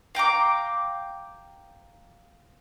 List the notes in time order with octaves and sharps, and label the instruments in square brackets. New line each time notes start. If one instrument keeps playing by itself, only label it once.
[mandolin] F5 G5 A#5 D6